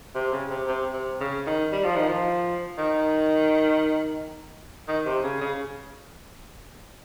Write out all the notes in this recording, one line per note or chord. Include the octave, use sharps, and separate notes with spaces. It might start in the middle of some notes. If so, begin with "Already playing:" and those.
C3
C#3
C3
C3
C3
C#3
D#3
G3
F3
D#3
F3
D#3
D#3
C3
C#3
C#3